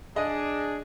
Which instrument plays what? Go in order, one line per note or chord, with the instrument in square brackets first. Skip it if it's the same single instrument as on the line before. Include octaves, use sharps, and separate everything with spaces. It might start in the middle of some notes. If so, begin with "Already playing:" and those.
[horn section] D4 G#4 [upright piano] D#5